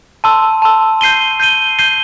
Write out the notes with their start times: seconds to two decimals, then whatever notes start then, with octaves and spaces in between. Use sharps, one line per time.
0.24 A5 C6 E6
0.62 A5 C6 E6
1.01 G6 C7 D#7 G7
1.40 G6 C7 D#7 G7
1.79 G6 C7 D#7 G7